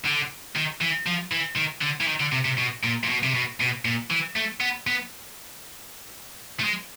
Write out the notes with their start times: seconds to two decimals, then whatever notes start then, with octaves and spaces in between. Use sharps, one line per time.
0.05 D3
0.55 D#3
0.81 E3
1.06 F3
1.32 E3
1.57 D#3
1.82 D3
2.01 E3
2.07 D#3
2.21 D3
2.33 C3
2.46 C3
2.59 B2
2.84 A#2
3.04 A#2
3.09 B2
3.24 C3
3.34 B2
3.60 B2
3.85 A#2
4.11 E3
4.36 A3
4.61 B3
4.87 B3
6.60 A3
6.64 G#3